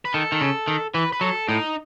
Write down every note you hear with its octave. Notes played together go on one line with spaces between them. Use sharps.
B4
D#3 A4
D#3
C#3
D#3
E3 B4
B4
F#3 A4
A2 D#4